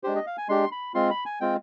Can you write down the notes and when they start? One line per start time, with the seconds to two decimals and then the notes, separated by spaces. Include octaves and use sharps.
0.04 G#3 D4 G4 C5
0.15 D#5
0.26 F5
0.38 G#5
0.49 G#3 D4 G4 C6
0.72 B5
0.94 G#3 C4 F4 C6
1.11 B5
1.25 G#5
1.41 G#3 C4 F4 G5